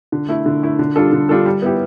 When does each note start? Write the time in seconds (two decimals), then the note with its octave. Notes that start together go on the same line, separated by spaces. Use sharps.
0.12 D3
0.29 A3 E4
0.46 D3
0.63 A3 E4
0.79 D3
0.96 G3 D4 F4 A4
1.12 D3
1.29 G3 D4 F4 A4
1.46 G3
1.62 B3 E4 G4